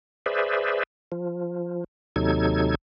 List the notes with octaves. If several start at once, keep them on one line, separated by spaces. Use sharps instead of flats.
G#4 B4 C5 D5 E5
F3
D#2 C3 F#3 D#4 A4 G#6